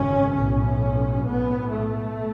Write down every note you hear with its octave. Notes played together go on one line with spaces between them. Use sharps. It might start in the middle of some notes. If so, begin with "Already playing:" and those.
Already playing: G#1 F#2 C#3 C#4
B1 A2 C#4
B1 A2 B3
A3